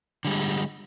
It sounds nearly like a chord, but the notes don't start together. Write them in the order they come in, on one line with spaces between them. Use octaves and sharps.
D3 G3 G#3